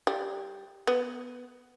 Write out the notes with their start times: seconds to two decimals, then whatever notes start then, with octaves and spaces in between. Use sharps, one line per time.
0.07 G3
0.87 B3